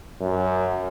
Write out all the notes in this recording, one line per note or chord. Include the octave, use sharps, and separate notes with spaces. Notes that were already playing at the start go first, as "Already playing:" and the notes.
F#2